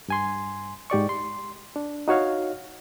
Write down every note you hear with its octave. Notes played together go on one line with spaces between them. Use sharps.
G2 G#5 C6
G#2 G4 D5 C#6
C6
D4
D#4 F#4 C#5 F5